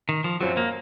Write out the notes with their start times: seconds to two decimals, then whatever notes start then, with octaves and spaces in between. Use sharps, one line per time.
0.09 D#3
0.24 F3
0.41 F#2 F3 F#3 C4 F4
0.57 A#3